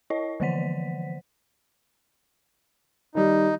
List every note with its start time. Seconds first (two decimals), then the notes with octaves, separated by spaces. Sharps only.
0.10 E4 C#5 D#5
0.40 D3 E3 F3 C5 F#5 B6
3.15 D#3 G3 D#4